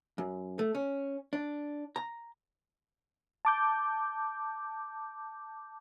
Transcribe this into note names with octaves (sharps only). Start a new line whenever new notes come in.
F#2
A3
C#4
D4
A#5
A5 D6 G6